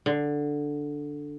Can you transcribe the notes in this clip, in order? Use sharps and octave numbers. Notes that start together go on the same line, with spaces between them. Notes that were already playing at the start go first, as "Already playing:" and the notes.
D3